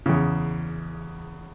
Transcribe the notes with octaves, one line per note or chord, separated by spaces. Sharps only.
E2 C#3